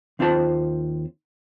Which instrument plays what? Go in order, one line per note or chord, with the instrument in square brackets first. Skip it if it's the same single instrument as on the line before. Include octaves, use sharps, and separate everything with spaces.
[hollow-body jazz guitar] D#2 C4 F4 C5 A5